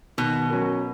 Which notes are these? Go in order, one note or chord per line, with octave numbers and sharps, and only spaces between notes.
B2 D#3
F#3 C#4 F#4 A#4